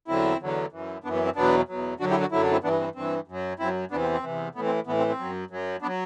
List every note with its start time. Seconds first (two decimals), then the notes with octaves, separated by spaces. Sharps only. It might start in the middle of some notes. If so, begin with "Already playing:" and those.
0.08 E2 D3 F#3 C4 E4
0.40 E2 D3 F#3
0.72 F#2 E3
1.04 F#2 E3 B3 D4
1.14 B3
1.25 C4
1.36 E2 B2 F#3 B3 D4
1.69 E2 B2 F#3
2.00 F#2 D3 F#3 D4 F#4
2.11 E4 G4
2.21 D4 F#4
2.32 F#2 D3 F#3 E4
2.42 D4
2.52 C4 E4
2.63 G2 E3 B3 D4
2.80 C4
2.95 G2 E3 C4
3.27 F#2 F#3
3.59 F#2 F#3 C4 E4
3.91 E2 C3 E3 B3 D4
4.02 C4
4.12 C4
4.23 E2 C3 E3
4.55 A2 B3
4.59 E3
4.66 C4
4.87 A2 E3 B3
4.98 C4
5.09 C4
5.19 F#2 F#3
5.50 F#2 F#3
5.82 B3 D4
5.86 F#3